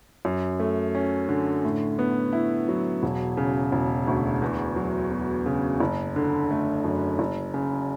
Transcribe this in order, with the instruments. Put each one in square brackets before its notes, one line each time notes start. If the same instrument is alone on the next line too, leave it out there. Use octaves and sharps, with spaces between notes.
[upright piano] F#2
A3
C#4
D3
A2
B3
E4
F#3
E1
C#3
E1
D2
E2
F#3
B3
C#3
F#1
D3
A3
F#2
F#1
C#3